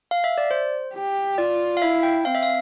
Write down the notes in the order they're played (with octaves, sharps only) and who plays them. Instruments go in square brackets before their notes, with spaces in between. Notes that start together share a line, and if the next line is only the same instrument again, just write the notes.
[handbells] F5
E5
D5
C5
[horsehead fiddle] G4
[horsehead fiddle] F4 [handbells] D5
[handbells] F5
[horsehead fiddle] E4 [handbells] E5
[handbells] G5
[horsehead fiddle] C4 [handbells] F5
[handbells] E5
F5